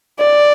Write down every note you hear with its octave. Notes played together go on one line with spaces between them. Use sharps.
D5